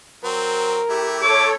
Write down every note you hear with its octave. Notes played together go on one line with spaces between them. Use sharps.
F#3 C4 A#4
A3 E4 G4
A4 C#5 D6